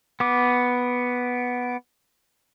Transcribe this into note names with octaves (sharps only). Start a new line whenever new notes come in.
B3 D6